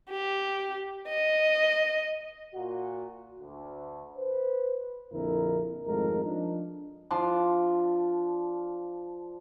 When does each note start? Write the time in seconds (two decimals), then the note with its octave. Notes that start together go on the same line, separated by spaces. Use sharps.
0.10 G4
1.08 D#5
2.54 A#2 F#4
3.40 D2
4.17 B4 C5
5.13 A#1 F2 D3 E4 A#4
5.86 G#1 F2 G#3 A3 A4 A#4
6.24 F3 D4 D#4
7.10 F3 D4 C6 D6